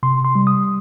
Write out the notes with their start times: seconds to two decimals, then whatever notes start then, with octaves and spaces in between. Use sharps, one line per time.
0.03 C3 C6
0.25 C6
0.35 G3
0.47 D#6